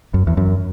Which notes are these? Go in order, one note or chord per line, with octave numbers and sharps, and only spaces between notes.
F#2
E2
F#2